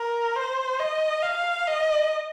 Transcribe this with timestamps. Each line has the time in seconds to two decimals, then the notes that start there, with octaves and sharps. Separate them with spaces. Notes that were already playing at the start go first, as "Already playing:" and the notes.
Already playing: A#4
0.36 C5
0.79 D#5
1.22 F5
1.66 D#5